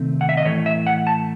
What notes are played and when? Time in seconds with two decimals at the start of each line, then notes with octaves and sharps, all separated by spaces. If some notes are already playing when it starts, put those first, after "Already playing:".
Already playing: C3 D#3 A3 C4
0.21 F#5
0.29 E5
0.37 D#5
0.45 A2 E3 A3 C#5
0.66 E5
0.87 F#5
1.07 A5